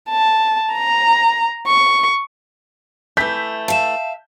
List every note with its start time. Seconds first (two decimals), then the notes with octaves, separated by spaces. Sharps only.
0.10 A5
0.73 A#5
1.67 C#6
3.17 E3 A3 G6 B6
3.68 E5 F5 A5 E7